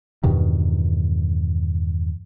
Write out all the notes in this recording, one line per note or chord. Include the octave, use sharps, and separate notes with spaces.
E2 G2 B2 D#3